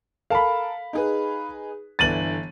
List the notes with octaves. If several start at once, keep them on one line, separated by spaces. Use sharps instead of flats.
A4 A#4 F5 A5 B5
D#4 G#4 B4
G1 D3 E3 A6 D#7 F#7